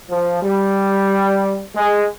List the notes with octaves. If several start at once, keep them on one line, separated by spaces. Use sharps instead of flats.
F3
G3
G#3